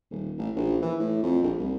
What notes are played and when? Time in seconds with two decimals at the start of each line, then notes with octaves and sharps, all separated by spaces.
0.11 D#1
0.38 A1
0.56 A#1
0.82 E3
0.99 A2
1.23 F2
1.43 A#1
1.58 C2